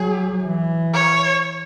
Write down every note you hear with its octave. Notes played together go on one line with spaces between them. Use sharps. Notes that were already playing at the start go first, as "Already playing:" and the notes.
Already playing: F#3 G#4
E3
C#5